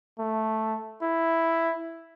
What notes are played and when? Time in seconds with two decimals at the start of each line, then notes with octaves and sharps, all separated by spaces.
0.19 A3
1.02 E4